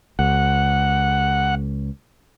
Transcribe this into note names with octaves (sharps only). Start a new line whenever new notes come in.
C#2 F#5